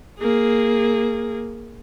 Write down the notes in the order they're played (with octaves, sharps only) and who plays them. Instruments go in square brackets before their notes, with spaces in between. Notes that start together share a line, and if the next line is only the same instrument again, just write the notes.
[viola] A#3 G#4